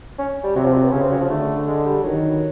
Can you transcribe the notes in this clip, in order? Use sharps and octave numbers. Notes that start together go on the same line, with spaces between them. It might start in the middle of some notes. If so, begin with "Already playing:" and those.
C#4
G3
C3 F#3
F3
F#3
B3
C#3 C#4
C4
F#3
F3
D3 A3
G#3
G3
D#3 F#3